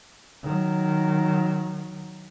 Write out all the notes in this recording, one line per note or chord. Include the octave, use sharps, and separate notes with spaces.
D#3 F#3